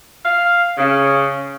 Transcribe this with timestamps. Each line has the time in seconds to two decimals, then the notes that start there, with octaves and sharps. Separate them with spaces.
0.24 F5
0.77 C#3